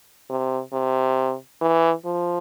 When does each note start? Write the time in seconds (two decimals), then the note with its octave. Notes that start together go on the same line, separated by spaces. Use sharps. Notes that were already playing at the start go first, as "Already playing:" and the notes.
0.30 C3
0.73 C3
1.61 E3
2.05 F3